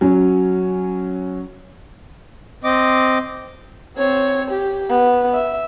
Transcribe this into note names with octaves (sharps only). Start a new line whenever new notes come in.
F#3 C#4
C4 D#5 D6
C4 C#5
G4
B3
E5